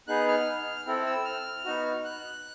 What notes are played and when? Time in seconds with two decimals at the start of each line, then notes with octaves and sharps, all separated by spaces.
0.07 B3 D#4 G#4 F#6
0.28 F6
0.87 C4 E4 A4
1.06 E6
1.25 F6
1.65 B3 D#4 F#4
2.05 F#6